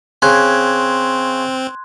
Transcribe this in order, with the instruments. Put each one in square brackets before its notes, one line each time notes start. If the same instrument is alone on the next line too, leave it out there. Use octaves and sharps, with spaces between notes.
[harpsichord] C#3 [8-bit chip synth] C4 [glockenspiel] C6 F#6 G#6